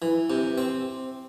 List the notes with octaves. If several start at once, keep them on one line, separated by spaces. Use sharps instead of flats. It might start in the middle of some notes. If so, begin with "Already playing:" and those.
E3
C3
C4